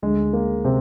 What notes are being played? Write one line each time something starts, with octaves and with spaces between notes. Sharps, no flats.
D2 D3 G#3
A#3
C3 C4